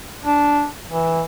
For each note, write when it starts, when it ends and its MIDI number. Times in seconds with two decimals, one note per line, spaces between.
0.24 0.67 62
0.88 1.22 52